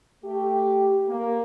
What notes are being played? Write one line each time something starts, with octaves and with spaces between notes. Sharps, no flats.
A3 G4
A#3